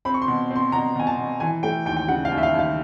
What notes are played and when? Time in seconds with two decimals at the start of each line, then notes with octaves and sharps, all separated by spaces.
0.05 C4 B5
0.14 C#6
0.22 C6
0.28 B2
0.50 C4 C6
0.72 B2 A#5
0.96 B2 G#5
1.07 A5
1.18 B2
1.40 E3 G#5
1.63 A3 G5
1.85 D#2 G5
1.97 G5
2.08 C#3 F#5
2.25 F5
2.31 D#2
2.38 E5
2.43 F5
2.54 D#2
2.59 F5